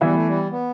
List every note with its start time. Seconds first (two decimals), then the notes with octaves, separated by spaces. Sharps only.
0.01 E3 G3 B3 E4
0.14 A3
0.27 G3
0.51 B3